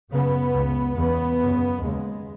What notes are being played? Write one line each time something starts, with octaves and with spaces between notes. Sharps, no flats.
F#2 C#3 B3
C#2 C#3
E2 C#3 B3
F#2 C#3
D#2 C#3 G#3